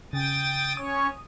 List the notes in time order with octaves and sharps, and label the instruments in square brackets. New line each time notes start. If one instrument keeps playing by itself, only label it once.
[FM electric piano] C#3 [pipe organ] G5 D#6 A6
[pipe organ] C#4 C#5 [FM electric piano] D#6